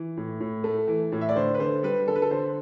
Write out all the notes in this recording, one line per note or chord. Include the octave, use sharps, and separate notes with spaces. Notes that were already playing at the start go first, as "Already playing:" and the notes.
Already playing: E3
A2
A2
A3
E3
A2
E5
D5
D3 C5
B4
D3 C5
G3 B4
D3 A4
B4
A4
D3 C5